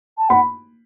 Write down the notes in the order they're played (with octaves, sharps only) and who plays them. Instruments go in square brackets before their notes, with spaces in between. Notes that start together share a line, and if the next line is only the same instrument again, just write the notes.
[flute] A5
[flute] F#5 [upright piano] B5